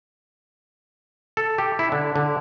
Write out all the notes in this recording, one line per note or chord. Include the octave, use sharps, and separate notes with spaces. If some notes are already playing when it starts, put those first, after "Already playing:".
A4
G4
E4
D3
D3